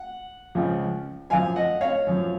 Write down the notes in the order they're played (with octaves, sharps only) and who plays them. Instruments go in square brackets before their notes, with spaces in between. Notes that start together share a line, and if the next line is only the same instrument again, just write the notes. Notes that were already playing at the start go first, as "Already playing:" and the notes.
Already playing: [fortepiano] F#5
C#2 C#3 F3
F#2 F3 F5 G#5
D#5 F#5
C#5 F5
F#2 F3